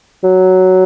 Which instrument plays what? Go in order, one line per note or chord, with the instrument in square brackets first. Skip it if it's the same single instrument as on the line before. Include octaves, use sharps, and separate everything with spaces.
[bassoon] F#3